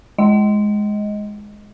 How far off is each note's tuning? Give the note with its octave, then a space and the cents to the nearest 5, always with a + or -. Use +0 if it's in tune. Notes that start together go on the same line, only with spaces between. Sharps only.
G#3 +5 D#5 +10